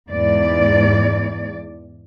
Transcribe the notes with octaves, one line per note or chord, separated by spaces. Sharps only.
E2 G#2 D5